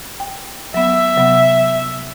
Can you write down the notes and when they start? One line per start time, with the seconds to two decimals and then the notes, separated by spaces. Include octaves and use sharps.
0.20 G5
0.74 F#3 B3 E5
1.16 C3 F#3 B3